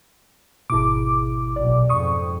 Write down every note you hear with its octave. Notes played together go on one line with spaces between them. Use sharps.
G#1 B2 E4 D6
B1 A#2 D5
F2 G#2 C#6 D#6